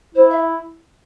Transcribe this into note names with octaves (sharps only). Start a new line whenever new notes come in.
E4 C5
E5